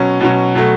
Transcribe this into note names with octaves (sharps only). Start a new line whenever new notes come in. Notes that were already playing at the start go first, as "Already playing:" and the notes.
Already playing: B2 F#3 C#4
B2 F#3 C#4
B2 F#3 A3